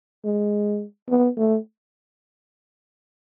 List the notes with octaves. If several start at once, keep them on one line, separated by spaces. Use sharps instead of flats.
G#3
B3
A3